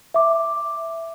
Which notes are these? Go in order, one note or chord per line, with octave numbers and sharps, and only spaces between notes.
E5 D6